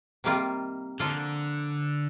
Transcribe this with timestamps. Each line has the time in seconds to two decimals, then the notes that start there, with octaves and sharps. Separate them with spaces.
0.24 C3 D#3 G3 A#3 F4
1.00 D3 F3 A#3 F4